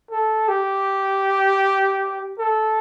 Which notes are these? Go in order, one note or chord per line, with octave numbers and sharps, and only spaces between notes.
A4
G4
A4